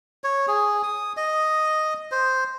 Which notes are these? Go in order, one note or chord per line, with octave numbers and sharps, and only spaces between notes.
C#5
G#4
D#6
D#5
C5